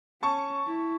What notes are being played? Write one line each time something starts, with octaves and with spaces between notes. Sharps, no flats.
C#4 A5 C#6
E4